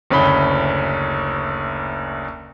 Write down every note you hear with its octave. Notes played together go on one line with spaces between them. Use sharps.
F#1 D2 C#4 B5 G7